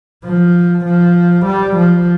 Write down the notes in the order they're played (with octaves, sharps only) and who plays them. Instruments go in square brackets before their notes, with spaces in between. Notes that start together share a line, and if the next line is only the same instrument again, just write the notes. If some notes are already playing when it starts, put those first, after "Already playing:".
[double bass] F3
F3
G3
F3